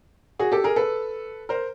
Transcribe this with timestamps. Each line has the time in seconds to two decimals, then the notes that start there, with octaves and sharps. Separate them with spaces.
0.39 F#4 G#4
0.52 G4 A4
0.64 G#4 A#4
0.76 A4 B4
1.49 A#4 C5